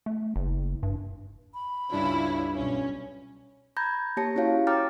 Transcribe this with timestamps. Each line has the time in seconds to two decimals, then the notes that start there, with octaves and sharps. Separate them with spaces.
0.06 A3
0.36 F#1
0.83 G2
1.54 B5
1.91 C#2 G2 C#4 D4 E4 F4
2.54 B1 C#4
3.77 A#5 B5 G6 G#6 A#6
4.17 A#3 G4 C#5 A5 A#6 C#7
4.35 C#4 E4 F#4 C#5 F5
4.67 C#5 G5 A#5 D6 F6 A6